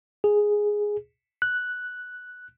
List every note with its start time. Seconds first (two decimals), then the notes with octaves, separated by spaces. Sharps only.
0.24 G#4
1.42 F#6